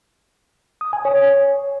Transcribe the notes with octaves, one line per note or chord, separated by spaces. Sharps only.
D#6
G#5
C#5